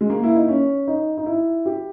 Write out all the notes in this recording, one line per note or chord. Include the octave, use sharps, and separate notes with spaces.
G#3
A#3
E4
D#4
C#4
D#4
D#4
E4
G4